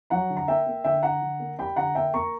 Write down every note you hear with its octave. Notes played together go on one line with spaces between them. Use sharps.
F#3 F#5 A#5
D3
A#5
A#3 E5 G5
A#3
D3 E5 G5
D3 F#5 A#5
D3
A#3
G3 G5 B5
D3 F#5 A#5
A#3 E5 G5
A#3 A#5 C#6